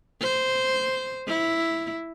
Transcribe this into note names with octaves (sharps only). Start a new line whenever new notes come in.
C5
E4